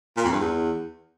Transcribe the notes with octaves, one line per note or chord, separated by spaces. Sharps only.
A#2
F2
G2
E2